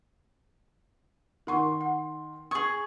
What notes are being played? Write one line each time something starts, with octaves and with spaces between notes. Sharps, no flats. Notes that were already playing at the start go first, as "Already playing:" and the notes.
D#3 A#4 F#5 C6 C#6
F#5
G#4 C#6 D#6 G#6